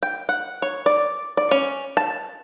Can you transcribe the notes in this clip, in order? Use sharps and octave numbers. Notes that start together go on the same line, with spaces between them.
G5
F#5
C#5
D5
D5
C#4
A5